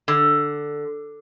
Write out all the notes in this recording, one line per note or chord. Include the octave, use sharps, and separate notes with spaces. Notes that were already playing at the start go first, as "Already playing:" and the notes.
D3